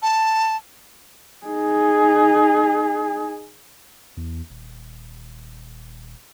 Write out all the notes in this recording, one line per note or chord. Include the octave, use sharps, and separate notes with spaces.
A5
D#4 G#4
E2
D#1